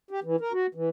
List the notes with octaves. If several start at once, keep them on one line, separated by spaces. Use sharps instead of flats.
G4
E3
A#4
F#4
E3